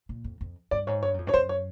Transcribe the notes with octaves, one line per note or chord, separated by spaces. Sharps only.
A#2
F2
F2
G2 D5
G#2 C#5
G2 C#5
F#2
F2
G2 C#5
F#2 C5
C#5